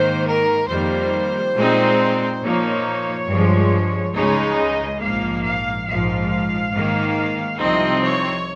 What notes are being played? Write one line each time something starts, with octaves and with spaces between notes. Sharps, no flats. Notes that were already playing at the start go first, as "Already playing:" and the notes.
Already playing: G#2 D#3 A#3 C5
A#4
F2 D#3 G3 A#3 C5
A#2 G#3 C4 D#4
A#2 F3 A#3 D#4 C#5
G2 F3 G#3
C#2 C#3 G#3 D#4 C#5
D#5
A#1 G#2 F3 A#3 F5
F5
A#1 G#2 F3 F5
G#2 D#3 A#3
C2 C3 F3 C4 D#4 D#5
C#5